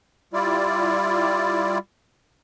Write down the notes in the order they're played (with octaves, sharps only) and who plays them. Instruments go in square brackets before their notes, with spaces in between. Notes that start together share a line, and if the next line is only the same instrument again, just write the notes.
[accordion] G3 E4 F4 D5